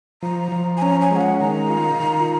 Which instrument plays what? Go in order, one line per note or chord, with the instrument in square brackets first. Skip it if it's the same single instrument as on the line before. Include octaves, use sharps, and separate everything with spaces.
[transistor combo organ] F3 [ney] A#5
[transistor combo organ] F3
[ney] G#5
[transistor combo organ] C#4 [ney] A#5
[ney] G#5
[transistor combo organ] G#3
[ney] F5
F#5
[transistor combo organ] D#3 [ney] A#5
[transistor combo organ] F4
D#3